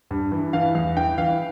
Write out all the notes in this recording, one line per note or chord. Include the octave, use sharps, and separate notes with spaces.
G2
E3
E3 F5
E2 F5
E3 G5
E3 F5